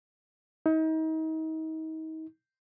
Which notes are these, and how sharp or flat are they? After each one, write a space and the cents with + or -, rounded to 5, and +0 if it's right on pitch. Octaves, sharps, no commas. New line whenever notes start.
D#4 +35